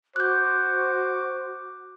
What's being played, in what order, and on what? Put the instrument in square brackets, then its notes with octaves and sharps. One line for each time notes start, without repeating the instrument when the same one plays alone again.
[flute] F#4 [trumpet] C5 [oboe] D6 [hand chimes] F#6 G6